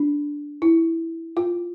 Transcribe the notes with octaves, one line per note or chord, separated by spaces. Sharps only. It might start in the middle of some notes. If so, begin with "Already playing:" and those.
Already playing: D4
E4
F4